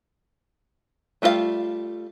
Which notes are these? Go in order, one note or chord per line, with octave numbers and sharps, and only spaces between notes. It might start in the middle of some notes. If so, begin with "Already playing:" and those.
G3 A3 F4 F#4 F5